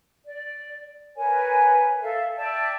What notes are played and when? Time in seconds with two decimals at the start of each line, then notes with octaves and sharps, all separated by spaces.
0.25 D5
1.16 A#4 B4 C#5 G#5
2.00 A4 E5 F5
2.36 D5 E5 G5 A5